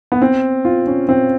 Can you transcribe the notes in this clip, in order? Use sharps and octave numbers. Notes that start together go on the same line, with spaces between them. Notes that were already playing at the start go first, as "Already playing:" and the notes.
B3
C4
F4
C#4
C4